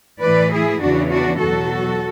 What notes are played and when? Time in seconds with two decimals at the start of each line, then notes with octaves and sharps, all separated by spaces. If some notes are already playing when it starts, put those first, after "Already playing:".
0.21 A2 E3 B4 D5
0.51 E4 G#4
0.80 E2 C#3 E3 D4 F#4
1.10 D4 F#4
1.39 E2 B2 F#3 F#4 A4